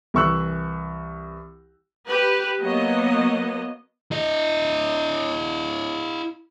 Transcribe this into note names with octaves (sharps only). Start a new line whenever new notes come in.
C2 E3 C#6 E6 F#6
G4 B4
F#3 A#3 B3 D#5
E4 D#5